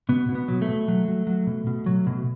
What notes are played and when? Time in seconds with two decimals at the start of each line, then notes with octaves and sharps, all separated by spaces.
0.09 B2 B3
0.29 B2
0.35 B3
0.48 F#3
0.62 A3
0.68 B2
0.88 F#3
1.08 F#3
1.27 F#3
1.47 B2
1.67 B2
1.86 F#3
2.07 B2